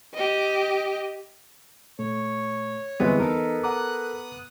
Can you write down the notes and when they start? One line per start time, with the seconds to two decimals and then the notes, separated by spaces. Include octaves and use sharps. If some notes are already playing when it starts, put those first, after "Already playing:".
0.14 G4 D#5
1.99 A#2 A3 C#5
3.00 D#2 D3 E3 G3 G#3 B3 C4
3.20 E2 D#4 A4 A#4
3.64 F#5 A#5 D6 D#6 F#6